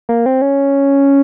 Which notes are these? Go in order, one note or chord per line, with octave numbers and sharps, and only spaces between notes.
A#3
C4
C#4